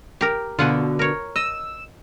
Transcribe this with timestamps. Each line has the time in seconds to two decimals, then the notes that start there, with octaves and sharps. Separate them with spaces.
0.21 G4 A#4
0.59 B2 D3 F4 F#5 G#5
0.99 A#4 C#5
1.36 D#5 E6